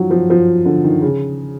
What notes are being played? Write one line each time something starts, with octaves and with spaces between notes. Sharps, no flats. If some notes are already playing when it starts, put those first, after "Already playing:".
Already playing: D#3 F3 F#3
F3
F3
D3
D#3
C#3